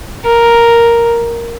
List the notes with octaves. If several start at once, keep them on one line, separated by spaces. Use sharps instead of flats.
A#4